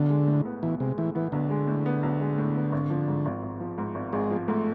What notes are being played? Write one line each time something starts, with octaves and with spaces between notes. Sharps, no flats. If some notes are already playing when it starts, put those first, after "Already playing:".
Already playing: B1 D3
G#3
A2
B3
B1 E3
C3 G#3
A2 E3
E3 B3
B1 D3
G#3
A2
B3
B1
G#3
A2
B3
G#1
F3
G#2
G#1
G#1
F3
G#2
G#1
G#1 G#3
F3
G#2 A3